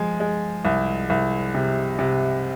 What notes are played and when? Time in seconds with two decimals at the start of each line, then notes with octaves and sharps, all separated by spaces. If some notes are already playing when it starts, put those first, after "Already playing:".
Already playing: F3 G#3
0.20 G#3
0.65 C2
1.10 C2
1.55 C3
1.99 C3